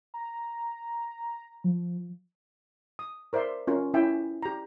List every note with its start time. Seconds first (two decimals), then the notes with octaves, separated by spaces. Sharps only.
0.14 A#5
1.64 F3
2.99 D#6
3.33 A#4 C5 D5 E5 C6
3.67 C#4 F4 A#4
3.94 C#4 E4 E5 G5 G#5
4.43 G4 A#5